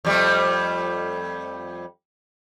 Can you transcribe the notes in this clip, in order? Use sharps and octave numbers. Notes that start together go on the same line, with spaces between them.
F2 G3 A3